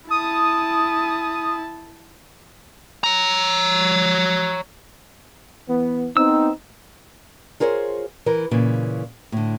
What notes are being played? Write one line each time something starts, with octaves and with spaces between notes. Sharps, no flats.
E4 A5 D#6
C#5 A#5
E3 B3
B3 C4 D#4 E6
F4 G#4 A#4 C5 C#5
E3 A#4
A#2 C#3 E3
A2 D3